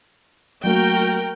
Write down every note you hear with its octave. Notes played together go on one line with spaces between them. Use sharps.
F#3 A3 A#3 F#4 A#4 G5